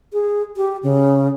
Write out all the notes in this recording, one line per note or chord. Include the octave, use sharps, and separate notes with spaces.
G#4
G4
C#3